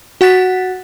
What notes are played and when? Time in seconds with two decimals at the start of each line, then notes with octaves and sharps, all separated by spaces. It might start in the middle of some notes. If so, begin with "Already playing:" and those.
0.21 F#4 F#5 F#6 A6 B6